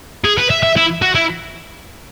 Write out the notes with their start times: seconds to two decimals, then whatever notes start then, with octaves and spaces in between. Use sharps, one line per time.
0.24 G#4
0.38 B4
0.50 E5
0.63 E5
0.76 E4
1.02 F#4
1.15 E4